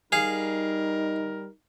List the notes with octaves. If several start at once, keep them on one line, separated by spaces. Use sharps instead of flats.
G3 D#4 G#4 A#4 F5